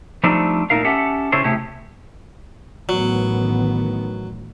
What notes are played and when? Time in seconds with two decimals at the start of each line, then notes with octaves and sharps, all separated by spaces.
0.23 F3 G3 A3 C4 D4 D#4
0.70 A#2 G3 A3 D#4 A#4 F5
0.85 C#4 G4 A4 E5 F#5
1.32 C#3 C#4 E4 G4 A4 C5
1.44 C3 A3 E4 G4 G#4
2.89 A1 D#3 F#3 B3